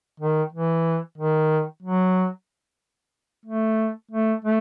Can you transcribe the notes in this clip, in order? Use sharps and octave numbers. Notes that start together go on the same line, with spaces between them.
D#3
E3
D#3
F#3
A3
A3
A3